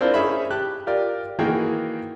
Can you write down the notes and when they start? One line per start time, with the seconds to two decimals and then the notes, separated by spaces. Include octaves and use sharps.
0.01 C4 D4 E4 F4 A#4 C5
0.14 C#4 D#4 G#4 E5 B5
0.50 G4 A5 F#6
0.87 F4 G4 A#4 D5
1.39 D#3 E3 A#3 F#4 G#4 G5